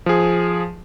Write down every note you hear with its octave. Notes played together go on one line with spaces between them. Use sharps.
F3 G#4